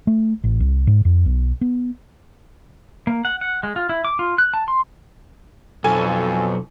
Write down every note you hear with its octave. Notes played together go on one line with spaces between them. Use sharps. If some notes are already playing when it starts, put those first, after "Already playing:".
A3
A1
C2
G#2
F2
B1
B3
A#3
F#5
F#5
G#3
F4
E4
D6
F4
F#6
A5
C6
B1 F2 A4 G#5